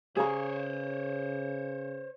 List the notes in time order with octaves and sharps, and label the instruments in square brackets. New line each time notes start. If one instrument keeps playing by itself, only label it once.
[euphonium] C#3 [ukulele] G#4 F5 A#5 [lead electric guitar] C5 C#5